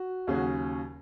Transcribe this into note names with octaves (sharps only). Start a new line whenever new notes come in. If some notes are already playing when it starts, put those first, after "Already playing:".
Already playing: F#4
D#2 C#3 F#3 C#4 G#4
F#4